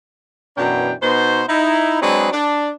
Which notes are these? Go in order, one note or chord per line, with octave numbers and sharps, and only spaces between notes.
F#2 B2 E3 D4 G5 A#5
B2 B3 D#4 C5
D#4 E4
F#3 G#3 C4 D4 G#4 B4
D4